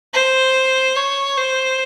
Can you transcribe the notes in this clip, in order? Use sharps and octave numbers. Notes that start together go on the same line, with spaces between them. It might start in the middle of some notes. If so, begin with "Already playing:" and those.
C5
C#5
C5